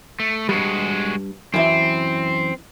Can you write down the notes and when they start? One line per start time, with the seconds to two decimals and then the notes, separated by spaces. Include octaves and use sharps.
0.20 A3
0.49 G2 G3 G#3 F#4
1.54 F#2 E3 C4 E5